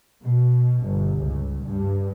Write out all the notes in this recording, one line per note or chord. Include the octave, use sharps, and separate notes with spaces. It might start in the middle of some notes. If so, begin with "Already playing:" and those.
B2
G1
C#2
G2